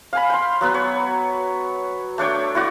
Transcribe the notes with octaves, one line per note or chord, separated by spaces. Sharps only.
F5 G#5 B5
G5 C6
F#3 B3 B4
C#5
A3 D4 C#5 G5
E4 F#4 D5